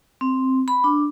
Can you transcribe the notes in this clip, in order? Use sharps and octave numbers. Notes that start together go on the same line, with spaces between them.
C4
B5
D4